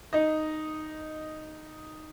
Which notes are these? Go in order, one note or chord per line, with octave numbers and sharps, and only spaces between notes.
D#4 D#5